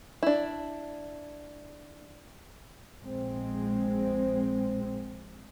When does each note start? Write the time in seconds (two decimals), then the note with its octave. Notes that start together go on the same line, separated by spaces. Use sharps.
0.23 D4 E4
3.02 A#1 G#3 C4